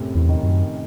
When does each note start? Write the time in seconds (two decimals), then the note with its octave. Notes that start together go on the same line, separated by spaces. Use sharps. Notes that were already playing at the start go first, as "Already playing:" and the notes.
Already playing: F#2 A2 C3
0.15 E2
0.29 D#3
0.43 F#2